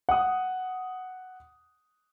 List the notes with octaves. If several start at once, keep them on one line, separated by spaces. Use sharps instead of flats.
F#5 D#6